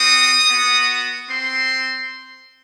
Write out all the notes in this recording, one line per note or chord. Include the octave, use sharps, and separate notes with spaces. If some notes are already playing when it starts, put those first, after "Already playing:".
Already playing: C4 F#4 D#6
B3 F#4
C4 C6